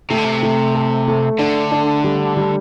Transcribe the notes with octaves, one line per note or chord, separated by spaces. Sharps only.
C3 A3
D3
C3
A3
A4
A3
D3 D4
D4
G3
G3